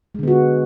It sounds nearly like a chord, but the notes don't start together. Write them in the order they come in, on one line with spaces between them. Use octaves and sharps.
G#3 D3 B3 F#4